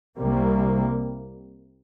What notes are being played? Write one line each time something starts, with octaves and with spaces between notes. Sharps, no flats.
C2 C3 G3 A#3